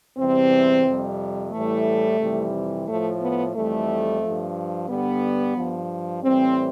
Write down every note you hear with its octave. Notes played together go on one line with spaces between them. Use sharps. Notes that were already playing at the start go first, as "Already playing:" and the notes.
E2 C3 E3 G3 C4
F2 C3 G3
A2 E3 G3 A3
F2 C3 E3 G3
A2 F3 A3
B3
F2 E3 G3 A3
G2 F3
G2 D3 G3 B3
G2 F3
A2 E3 G3 C4